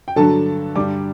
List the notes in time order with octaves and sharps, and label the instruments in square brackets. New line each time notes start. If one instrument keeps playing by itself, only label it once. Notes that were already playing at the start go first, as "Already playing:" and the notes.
[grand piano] G5
G2 D3 F#3 A4 A5
G2 D3 G3 D5 D6